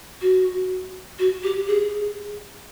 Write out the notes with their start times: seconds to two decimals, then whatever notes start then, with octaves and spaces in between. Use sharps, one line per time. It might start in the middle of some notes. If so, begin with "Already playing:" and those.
0.22 F#4
1.19 F#4
1.43 G4
1.68 G#4